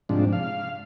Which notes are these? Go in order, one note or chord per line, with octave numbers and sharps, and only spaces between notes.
G#2 C3 F3 D4
F5